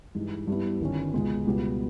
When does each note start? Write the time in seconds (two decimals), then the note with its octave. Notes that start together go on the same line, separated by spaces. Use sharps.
0.15 G2 E3 G#3 D#4
0.47 G2 G3 B3 E4
0.80 G1 G2 D#3 G3 C#4
1.13 C#2 B2 G#3
1.46 C#2 B2 G3 B3